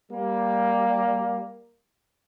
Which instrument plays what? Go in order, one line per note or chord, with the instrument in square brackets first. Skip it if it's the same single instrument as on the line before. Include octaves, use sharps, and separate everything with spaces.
[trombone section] G3 A#3